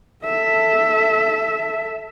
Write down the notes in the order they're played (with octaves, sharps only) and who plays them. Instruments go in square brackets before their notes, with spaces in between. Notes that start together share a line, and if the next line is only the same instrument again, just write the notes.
[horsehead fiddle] A4 E5